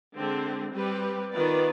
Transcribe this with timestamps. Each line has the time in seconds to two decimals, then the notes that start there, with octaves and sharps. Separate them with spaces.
0.16 D3 G#3 C4
0.74 G3 C4 G4 B4
1.32 D#3 B3 F4 B4 D5